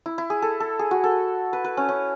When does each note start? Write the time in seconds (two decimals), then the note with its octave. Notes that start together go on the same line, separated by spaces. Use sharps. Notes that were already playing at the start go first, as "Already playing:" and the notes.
0.06 E4
0.18 E4
0.30 G#4
0.42 A4
0.60 A4
0.79 G#4
0.91 F#4
1.04 A4
1.53 B4
1.64 B4
1.77 C#4
1.89 C#4